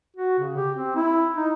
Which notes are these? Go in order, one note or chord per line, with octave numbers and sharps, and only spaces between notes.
F#4
C#3
G4
C4
E4
D#4